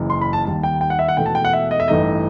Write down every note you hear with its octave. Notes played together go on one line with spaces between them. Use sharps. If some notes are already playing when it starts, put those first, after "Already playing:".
Already playing: F#1 F#2 E3
C6
B5
A5
D#2 D#3 G3 A5
G5
G5
F#5
E5
F#5
E1 E2 B2 A3 G5
A5
G5
F#5
E5
D#5
E5
A1 G2 E3 A3 D#4 D#5